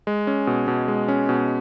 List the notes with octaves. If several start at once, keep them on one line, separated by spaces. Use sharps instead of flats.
G#3
C#4
B2
B2
G#3
C#4
B2